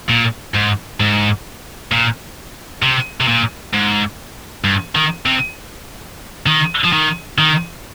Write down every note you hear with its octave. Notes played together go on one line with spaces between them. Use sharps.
A#2
G#2
G#2
A#2
C3
C3
A#2
G#2
G2
D#3
C3
D#3
F3
D#3
D#3